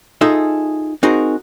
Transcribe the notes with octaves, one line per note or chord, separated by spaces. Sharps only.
D#4 F4 G#4 A4 E5
C4 D#4 F#4 G#4 A#4